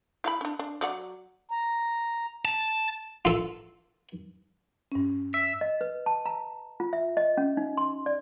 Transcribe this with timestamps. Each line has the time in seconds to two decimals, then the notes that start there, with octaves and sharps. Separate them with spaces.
0.24 E4 F5 B5
0.41 C#4 D4
0.59 D4
0.81 F#3 D5 F#5
1.51 A#5
2.45 A5
3.25 F4 A4
4.92 G2 C#4
5.34 E5
5.61 D#5
5.81 B4
6.06 A5
6.26 A#5
6.80 F4
6.93 E5
7.17 D#5
7.37 C#4
7.57 D#4
7.77 C6
8.06 D5